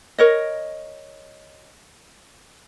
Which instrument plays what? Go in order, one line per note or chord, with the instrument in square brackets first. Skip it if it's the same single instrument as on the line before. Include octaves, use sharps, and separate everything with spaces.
[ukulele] A#4 C#5 D#5